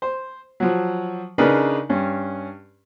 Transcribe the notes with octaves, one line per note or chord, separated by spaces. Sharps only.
C5
F3 F#3
C#3 D4 D#4 G#4 A#4 B4
G2 C#4